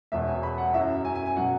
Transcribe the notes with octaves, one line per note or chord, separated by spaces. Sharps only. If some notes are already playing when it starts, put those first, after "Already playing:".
E1 E2 B2 E5
G#5
B5
F#5
F#2 F#3 E4 E5
G#5
G#5
G#5
B2 F#3 F#5